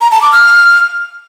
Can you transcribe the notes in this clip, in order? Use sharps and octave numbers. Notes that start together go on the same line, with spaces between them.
A#5
A5
D6
F6